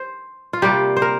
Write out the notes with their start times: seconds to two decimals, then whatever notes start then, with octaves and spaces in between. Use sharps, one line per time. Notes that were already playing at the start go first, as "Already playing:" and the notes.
Already playing: C5
0.53 F4
0.62 C3 G3 A#3 G4
0.97 C5
1.02 A#4